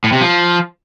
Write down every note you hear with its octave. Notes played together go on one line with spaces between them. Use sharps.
A2
C3
F3